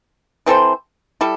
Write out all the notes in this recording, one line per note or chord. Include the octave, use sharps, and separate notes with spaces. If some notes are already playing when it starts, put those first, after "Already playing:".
E3 C4 A4 C5
G3 E4 A4